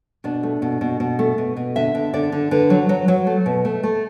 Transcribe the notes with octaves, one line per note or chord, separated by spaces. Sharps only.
B2 D4
A3
B2
B2
B2
A3
B2
B2
D3 E5
D3
D3 D5
D3
D3 B4
F#3
F#3
F#3
A3
B2
A3
A3